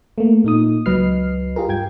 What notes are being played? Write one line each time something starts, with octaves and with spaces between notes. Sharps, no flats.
A3 A#3
A#2 D#4 D#6
C#2 F#3 B4 D#5 F6 C7
F4 G4 G#4 A#4
G2 G5 G#6